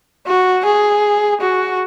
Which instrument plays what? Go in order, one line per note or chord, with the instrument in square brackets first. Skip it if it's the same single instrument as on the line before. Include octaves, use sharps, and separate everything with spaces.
[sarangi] F#4
G#4
F#4